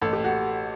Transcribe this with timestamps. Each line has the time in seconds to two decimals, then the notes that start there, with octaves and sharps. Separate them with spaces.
0.02 A1 A4
0.13 G4
0.24 F#4